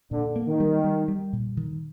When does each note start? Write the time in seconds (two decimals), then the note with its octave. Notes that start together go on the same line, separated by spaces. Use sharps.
0.11 A#2 D3
0.36 A#3
0.48 D#3
0.60 G3
0.84 G3
1.08 G3
1.33 A#2
1.57 D#3